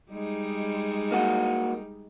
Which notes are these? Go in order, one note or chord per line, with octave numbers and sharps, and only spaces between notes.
G3 G#3 D#4
A#3 F#4